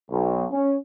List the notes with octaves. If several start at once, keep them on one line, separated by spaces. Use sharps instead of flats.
B1
C#4